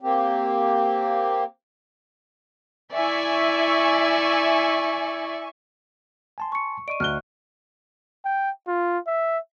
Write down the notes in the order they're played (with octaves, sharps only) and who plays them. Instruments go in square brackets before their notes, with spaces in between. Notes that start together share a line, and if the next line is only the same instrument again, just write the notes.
[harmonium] A#3 C4 G4
[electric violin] E4 D5 [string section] E5 G#5 C#6
[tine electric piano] G#5 A5 C6
[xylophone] C#6 C#7
[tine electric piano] D5 D#5 C#6 [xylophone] D7 D#7
[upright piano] D2 G7 [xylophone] F6 F#6
[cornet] G5
F4
E5